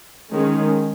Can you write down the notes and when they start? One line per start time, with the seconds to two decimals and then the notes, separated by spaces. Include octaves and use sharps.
0.31 D#3 G#3 C#4